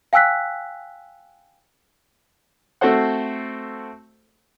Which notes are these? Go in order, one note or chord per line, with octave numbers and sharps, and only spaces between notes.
F5 G5 G#5 E6 F#6 B6
A3 C4 F#4 A4 C5 F#5